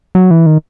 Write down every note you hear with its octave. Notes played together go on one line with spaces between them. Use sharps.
F#3
E3
D#3